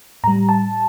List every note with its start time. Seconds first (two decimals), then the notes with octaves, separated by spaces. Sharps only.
0.24 A2 A#5
0.27 G3
0.49 A5